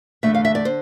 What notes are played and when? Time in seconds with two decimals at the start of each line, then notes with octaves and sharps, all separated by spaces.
0.23 E2 D3 A3 E5
0.35 F5
0.45 E5
0.55 D5
0.65 D3 C5